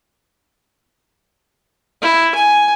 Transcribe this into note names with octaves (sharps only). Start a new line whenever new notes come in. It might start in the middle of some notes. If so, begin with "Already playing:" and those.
E4
G#5